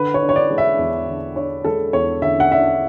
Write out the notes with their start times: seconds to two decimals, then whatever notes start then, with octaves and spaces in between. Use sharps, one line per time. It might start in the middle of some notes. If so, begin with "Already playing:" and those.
Already playing: D3 B4
0.14 C#5
0.22 D4
0.29 C#5
0.36 D5
0.50 G#3
0.58 E5
0.79 E2
1.07 D3
1.36 D4 C#5
1.64 G#3 A4
1.93 E2 C#5
2.22 D3 E5
2.40 F#5
2.52 D4 E5